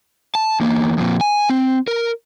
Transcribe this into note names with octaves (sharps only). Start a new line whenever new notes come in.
A5
E2 A#3
F2 A#2
G#5
C4
A#4